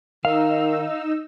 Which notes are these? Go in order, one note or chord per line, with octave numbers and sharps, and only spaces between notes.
D#3 D#4 F5 E6